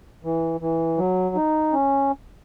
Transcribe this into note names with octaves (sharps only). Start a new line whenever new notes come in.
E3
E3
F#3
D#4
C#4